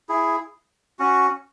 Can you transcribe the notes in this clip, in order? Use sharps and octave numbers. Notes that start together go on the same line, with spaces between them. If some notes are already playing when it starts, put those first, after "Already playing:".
E4 G#4
C#4 F#4